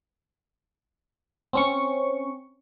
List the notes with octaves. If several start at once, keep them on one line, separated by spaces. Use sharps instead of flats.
C4 C#4 C#6